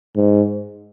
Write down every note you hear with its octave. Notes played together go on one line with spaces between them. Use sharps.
G#2